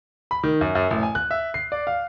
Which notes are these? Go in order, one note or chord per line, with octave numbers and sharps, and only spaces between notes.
B5
D#3
F#2
F#2
A1
G#5
F#6
E5
C7
D5
F5